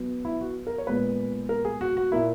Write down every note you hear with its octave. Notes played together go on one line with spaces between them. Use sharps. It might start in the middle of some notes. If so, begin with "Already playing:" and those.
Already playing: B2 F#3 B3
E4
F#4
A#4
C#5
A#2 G#3 B3 B4
A#4
G#4
F#4
F#4
A#2 A#3 E4